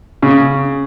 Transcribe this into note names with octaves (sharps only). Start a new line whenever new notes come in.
C#3